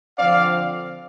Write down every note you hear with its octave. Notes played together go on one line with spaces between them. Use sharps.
D3 F3 C4 D5 F5